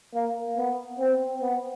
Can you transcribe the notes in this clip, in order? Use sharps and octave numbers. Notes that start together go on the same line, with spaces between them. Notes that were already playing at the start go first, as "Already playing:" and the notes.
A#3
B3
C4
B3